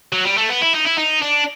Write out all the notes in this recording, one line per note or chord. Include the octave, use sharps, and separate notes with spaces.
F#3
G3
A3
B3
E4
D#4
E4
D#4
D4